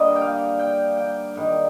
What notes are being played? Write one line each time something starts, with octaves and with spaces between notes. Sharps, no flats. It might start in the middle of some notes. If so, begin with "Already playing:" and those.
Already playing: D3 G3 A#3 D#5
G5
F5
G5
G5
G#2 D#3 G3